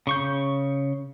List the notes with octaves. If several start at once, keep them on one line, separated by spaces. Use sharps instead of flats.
C#3 C#6 G6